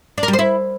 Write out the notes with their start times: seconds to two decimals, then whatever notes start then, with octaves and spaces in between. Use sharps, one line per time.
0.18 D4
0.23 A#4
0.28 G3
0.33 C5
0.39 E4